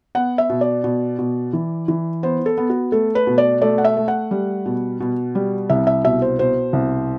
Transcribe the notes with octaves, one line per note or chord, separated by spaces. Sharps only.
B3 F#5
E5
B2
D5
B2
B2
E3
E3
B3 C5
A4
B3
F#4
A3 A4
B4
B2
D5
A3 D5
F#5
E5
A3
F#5
G3
B2
B2
G3
C2 E5
E5
B2 E5
C5
B2 C5
C2